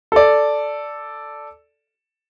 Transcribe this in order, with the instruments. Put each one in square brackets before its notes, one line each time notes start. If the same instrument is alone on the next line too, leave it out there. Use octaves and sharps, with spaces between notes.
[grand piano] A4 D5